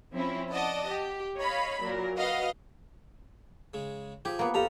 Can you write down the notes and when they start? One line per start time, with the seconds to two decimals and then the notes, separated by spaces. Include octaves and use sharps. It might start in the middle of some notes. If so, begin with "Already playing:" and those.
0.14 F3 C4 C#4 E4
0.52 D5 D#5 F#5 A5
0.90 G4
1.37 C#5 D#5 F5 B5
1.81 A#2 F#3 A#4
2.16 F#4 B4 D#5 F5 F#5
3.74 C#3 G#3
4.25 F3 G4 G#4
4.39 A#3 B3
4.54 F2 G4 A4 F5 A5 A#5